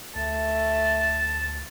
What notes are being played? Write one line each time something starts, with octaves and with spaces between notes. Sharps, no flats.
D2 A3 A5